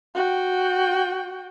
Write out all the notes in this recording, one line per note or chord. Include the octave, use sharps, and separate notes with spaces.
F#4 G5